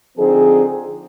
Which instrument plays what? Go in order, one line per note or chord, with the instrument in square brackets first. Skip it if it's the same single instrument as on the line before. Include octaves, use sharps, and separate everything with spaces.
[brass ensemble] D3 F3 C4 D#4 G#4